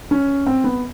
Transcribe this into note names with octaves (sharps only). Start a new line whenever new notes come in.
C#4
C4
B3